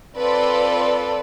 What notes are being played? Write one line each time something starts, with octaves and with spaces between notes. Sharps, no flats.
C4 F4 A4 B4 D5